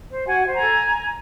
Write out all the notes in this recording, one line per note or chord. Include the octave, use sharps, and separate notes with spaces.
C5
F#4 F#5 G#5
C5
G#5 A#5
A4